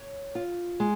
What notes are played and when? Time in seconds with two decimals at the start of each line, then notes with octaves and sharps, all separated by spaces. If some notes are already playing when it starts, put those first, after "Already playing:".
Already playing: C#5
0.35 F4
0.80 G#3